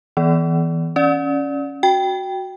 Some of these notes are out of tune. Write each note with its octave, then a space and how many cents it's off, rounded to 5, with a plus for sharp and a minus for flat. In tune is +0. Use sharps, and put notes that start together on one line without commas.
E3 -20 B3 +0 D5 -20
C#4 +0 D5 +0
F#4 +0 G5 +0